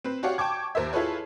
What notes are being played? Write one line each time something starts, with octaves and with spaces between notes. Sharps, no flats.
C4 B4
F#4 G4 C#5 D5 F5 F#5
G5 A5 C#6 D6 G#6
D#2 A#4 C5 E5
E4 F4 G#4 A4 B4 C#5